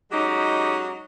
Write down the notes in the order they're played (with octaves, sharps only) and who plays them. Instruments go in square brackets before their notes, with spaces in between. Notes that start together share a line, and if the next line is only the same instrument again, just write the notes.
[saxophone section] F#3 G#3 C#4 D#4 G4